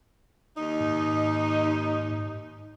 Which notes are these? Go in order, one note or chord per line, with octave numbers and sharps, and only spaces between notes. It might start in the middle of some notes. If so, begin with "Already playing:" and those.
D#2 D#4
G#2